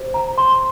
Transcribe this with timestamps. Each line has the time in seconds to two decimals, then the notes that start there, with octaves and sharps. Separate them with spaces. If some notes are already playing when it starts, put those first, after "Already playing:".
Already playing: G4 C5
0.14 A#5
0.38 C6